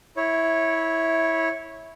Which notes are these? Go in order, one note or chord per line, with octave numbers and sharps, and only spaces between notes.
E4 C#5